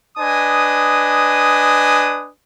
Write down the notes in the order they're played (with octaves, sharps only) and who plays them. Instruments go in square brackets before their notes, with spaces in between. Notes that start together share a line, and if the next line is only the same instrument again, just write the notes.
[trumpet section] D4 B4 D#5 G#5 D#6